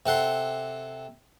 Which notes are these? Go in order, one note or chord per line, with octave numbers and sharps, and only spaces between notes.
C3 A4 F#5 C6